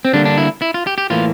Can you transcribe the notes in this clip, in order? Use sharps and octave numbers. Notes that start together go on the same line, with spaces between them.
C4
D3 G3 A#3 D4
D4
E4
E4
F4
G4
G4
A2 E3 A#3 F4